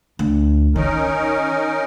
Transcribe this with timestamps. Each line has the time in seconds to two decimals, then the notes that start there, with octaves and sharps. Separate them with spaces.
0.19 D2
0.76 D#3 C#4 D#4 A#4